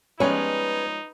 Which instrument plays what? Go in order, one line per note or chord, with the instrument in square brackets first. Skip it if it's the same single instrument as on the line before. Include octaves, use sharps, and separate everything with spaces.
[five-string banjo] F3 G#3 C#5 [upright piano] G3 B3 C#4 [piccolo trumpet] D#4 [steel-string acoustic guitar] B4